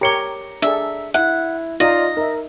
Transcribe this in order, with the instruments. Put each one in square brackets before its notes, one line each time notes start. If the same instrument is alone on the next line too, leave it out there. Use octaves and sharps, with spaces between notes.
[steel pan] G4 A#4 C#5 [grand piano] A#5 C#7 G7
[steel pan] D4 G#4 A4 [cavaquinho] E5
[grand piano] E4 [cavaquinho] F#5
[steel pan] D#4 [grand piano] F4 D5 F5 [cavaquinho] D#5
[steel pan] D#4 E5 [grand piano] A#4